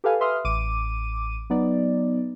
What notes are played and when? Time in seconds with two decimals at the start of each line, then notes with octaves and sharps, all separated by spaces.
0.04 G4 A4 B4 F5 G#5
0.20 B4 E5 C6 D#6 F6
0.45 A1 D6 D#7
1.50 F#3 B3 D#4 D5